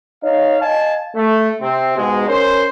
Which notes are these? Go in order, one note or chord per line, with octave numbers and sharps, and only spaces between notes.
D#4 C#5 F5
D#5 F5 G#5 A5
A3
C3 C4
G#2 B2 G#3
C#4 A#4 C5